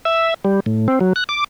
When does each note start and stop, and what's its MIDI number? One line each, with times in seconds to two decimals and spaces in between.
0.05 0.34 76
0.45 0.60 55
0.66 0.88 45
0.88 0.99 60
1.01 1.13 54
1.16 1.24 90
1.29 1.44 86